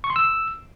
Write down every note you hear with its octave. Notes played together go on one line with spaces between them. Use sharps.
C#6
C6
E6